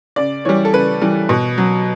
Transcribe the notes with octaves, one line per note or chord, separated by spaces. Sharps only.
C#3 D5
E3 G3 C#5
A4
C#3 B4
E3 G3
B2
F#3